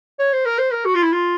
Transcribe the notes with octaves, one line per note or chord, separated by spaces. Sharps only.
C#5
C5
A#4
C5
A#4
F#4
F4
E4
F4